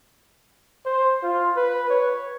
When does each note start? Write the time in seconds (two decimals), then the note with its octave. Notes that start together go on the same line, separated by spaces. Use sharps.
0.85 C5
1.23 F4
1.56 B4
1.90 C#5